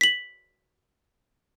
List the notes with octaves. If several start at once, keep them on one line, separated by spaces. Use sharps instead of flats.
B6 F#7